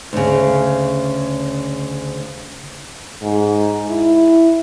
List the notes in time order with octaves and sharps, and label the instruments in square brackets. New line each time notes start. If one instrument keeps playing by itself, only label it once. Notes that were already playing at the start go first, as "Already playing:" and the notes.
[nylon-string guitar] D2 C#3
[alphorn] G#2
E4